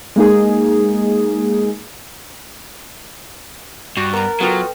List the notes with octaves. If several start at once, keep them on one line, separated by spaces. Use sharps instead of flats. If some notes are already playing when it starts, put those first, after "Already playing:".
G#3 A#3 D#4 G#4
G2 F#4 B5 F#6 A6
B3 A#4 A#5
F#3 B3 F4 F#4 A4 B4 G5